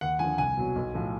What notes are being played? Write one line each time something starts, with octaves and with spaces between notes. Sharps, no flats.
D#2 F#5
D3 F3 G#5
C2 G#5
B2 F#3
B1
A2 F3